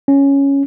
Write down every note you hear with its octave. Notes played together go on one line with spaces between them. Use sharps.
C#4